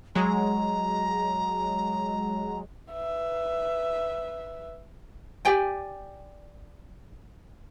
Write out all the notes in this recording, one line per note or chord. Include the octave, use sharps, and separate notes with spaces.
F#3 G#3 A#5
B4 E5
G4 D5 G5 G#5